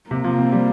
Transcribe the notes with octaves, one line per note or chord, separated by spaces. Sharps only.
C3 A#3
F3
C4
G3